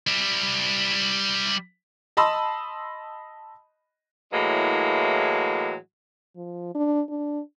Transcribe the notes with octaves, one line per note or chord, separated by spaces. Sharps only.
G3 E4
D#5 A5 B5 C6 D#6 E6
A2 E3 F#3 G#3 A#3
F3
D4
D4